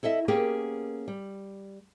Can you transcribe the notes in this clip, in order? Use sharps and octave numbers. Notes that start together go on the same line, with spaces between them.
E4 A4 D#5 E5
A#3 B3 C#4 G4 G#4 A#4
G3